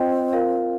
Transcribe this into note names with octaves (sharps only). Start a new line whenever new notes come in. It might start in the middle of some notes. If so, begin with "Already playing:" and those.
Already playing: C4 F4 D#5 G5
F4 A#4 F5